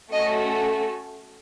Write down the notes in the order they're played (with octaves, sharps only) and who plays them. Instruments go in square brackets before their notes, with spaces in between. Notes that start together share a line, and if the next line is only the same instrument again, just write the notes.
[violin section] A3 C#4 F#4 A4 D#5